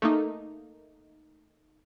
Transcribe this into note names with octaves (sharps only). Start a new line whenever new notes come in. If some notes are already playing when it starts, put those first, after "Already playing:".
A3 A#3 D#4